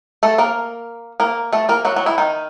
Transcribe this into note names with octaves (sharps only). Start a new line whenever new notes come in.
A3 A4
A#3 A#4
A#3 A#4
A3 A4
A#3 A#4
F#3 F#4
F#3 F#4
E3 E4
D#3 D#4